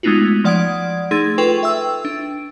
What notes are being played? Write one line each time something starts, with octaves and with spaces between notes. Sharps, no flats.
G#3 A3 B3 D#4 F4 F#4
F3 D5 F#5 D#6 G#6 D7
A3 D#4 G#4 C6 G#6 A6
F4 A4 B4 G5 C#6
E5 G5 E6
D4